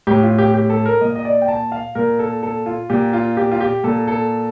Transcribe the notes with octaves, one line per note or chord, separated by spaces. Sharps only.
A2 G4
F4
G4
G4
A4
A#4
A#2 D#5
D#5
D5
G5
A5
F5
A#2 A#4
A4
A4
F4
A#2 G4
F4
G4
F4
G4
A#2 A4
A4